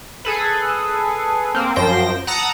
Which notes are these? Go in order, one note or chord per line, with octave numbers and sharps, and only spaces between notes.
G#4 A4 B4
A#3 C4
F#2 F3 C5 G5 A#6
F#5 A5 A#5 D#6 E6